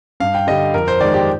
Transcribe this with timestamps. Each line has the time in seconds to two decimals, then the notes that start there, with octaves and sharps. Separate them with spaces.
0.20 G2 F5
0.34 G5
0.47 D3 G3 D#5
0.74 F2 A#4
0.88 C5
1.00 D#3 G#3 D5
1.14 G4